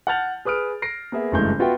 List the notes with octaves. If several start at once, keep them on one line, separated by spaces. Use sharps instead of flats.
F#5 A5 F6 G6 A6 F7
G#4 B4 D#6 F6 D7
A#6 C7 D7
A#3 B3 G#4 E5
F#1 G2 E3 G#3 A3 G6
B3 F4 F#4 B4 E5 G5